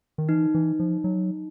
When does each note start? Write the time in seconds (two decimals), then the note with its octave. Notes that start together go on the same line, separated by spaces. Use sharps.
0.18 D#3
0.29 E3 D#4
0.54 E3
0.80 F3
1.04 F#3